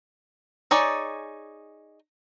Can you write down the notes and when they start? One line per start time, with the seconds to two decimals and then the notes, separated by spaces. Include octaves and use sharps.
0.71 D#4 G#4 C#5 D5